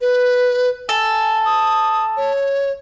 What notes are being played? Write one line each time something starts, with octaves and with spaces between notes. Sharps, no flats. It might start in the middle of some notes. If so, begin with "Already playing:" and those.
B4
A4 G#5
D#6
C#5